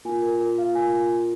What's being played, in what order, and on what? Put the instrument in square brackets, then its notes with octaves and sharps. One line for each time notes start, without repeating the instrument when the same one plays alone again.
[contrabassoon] A#2 [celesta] G#5
[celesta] A#4
A#4
F5
G#5